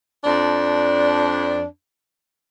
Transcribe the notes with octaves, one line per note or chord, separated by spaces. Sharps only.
F2 D4